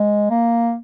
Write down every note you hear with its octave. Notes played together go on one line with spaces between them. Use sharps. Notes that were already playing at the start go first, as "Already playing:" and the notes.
Already playing: G#3
A#3